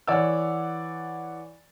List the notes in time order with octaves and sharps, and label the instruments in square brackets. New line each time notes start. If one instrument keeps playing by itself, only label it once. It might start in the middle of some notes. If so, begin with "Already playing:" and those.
[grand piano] E3 C#5 D5 F#5 E6